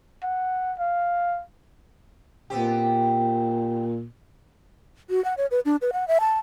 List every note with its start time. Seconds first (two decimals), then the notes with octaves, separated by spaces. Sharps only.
0.23 F#5
0.79 F5
2.50 A#2 B3 C4 G4
5.10 F#4
5.25 F#5
5.37 C#5
5.51 B4
5.65 D4
5.82 B4
5.93 F#5
6.08 E5
6.20 A5